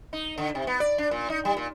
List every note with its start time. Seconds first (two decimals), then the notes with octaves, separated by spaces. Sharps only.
0.13 D#4
0.38 D3
0.55 C3
0.67 B3
0.80 D5
0.98 D4
1.11 A#2
1.30 D#4
1.45 G3
1.57 A#2